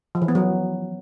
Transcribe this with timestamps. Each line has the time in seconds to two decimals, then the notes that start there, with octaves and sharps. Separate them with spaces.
0.15 F3
0.22 E3
0.28 B3
0.35 F#3